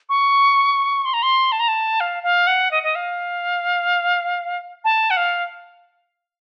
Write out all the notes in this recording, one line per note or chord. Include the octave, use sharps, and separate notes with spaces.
C#6
C6
A#5
C6
A5
A#5
A5
F5
F5
F#5
D#5
D#5
F5
A5
F#5
F5